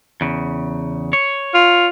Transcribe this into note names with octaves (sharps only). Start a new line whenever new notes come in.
E2 C#3
C#5
F4